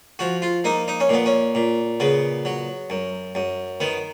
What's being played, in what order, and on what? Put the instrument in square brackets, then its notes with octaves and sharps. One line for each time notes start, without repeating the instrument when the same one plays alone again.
[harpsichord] F3 F#4
F4
A#3 D#4
D#4
C#4
A#2 B3
C#4
A#2
C#3 B3
F#3
F#2
F#2
D#3 B3